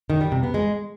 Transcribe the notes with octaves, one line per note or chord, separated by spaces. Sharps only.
D#3
G3
C3
B3
G#3